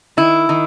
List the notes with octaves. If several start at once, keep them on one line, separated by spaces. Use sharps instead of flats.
D#3 E4
D#3